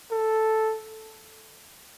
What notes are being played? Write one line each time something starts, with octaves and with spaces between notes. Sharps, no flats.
A4